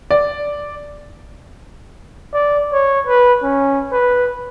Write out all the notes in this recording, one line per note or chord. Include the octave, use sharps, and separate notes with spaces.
D5
D5
C#5
B4
C#4
B4